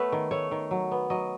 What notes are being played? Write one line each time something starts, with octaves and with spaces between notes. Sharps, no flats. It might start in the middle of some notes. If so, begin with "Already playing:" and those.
Already playing: A3 B3 B4 C#5
D#3
A3 C#5
D#3
F#3
B3
F#3 D#5